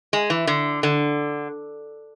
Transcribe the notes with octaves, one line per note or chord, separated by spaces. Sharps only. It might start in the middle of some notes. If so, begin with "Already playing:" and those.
G#3
E3
D3
D3